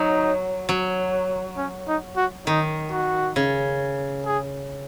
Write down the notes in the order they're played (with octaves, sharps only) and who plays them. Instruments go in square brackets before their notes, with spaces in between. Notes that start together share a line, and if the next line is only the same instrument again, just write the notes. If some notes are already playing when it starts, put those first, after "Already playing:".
Already playing: [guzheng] F#3 [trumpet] D#4
[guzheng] F#3
[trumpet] C#4
D#4
F#4
[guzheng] D#3 [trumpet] D#4
[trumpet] F#4
[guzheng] C#3
[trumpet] G#4